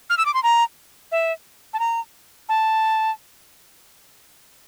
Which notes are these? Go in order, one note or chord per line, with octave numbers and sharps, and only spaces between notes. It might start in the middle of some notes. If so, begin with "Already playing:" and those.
F6
E6
D6
C6
A#5
E5
A5
A#5
A5